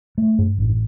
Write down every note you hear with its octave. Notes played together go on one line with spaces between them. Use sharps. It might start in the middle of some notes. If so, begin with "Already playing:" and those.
A3
G2
A1